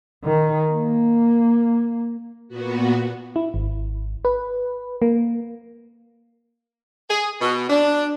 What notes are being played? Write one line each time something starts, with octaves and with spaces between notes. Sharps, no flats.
D#3
A#3
A#2 B3 F#4
E4
G#1
B4
A#3
G#4
B2
D4